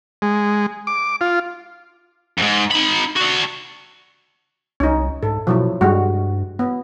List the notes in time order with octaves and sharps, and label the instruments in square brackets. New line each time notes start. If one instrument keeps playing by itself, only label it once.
[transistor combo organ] G#3
D6
F4
[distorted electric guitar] F2 G#2
D#4 B5
F#4 D5
[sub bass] C2 [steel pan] C#4 D#4
[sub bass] G#2 [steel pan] A4
[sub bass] B2 [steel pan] F3 F#3 E4
[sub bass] G2 [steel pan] G3 G#3 F#4
[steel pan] B3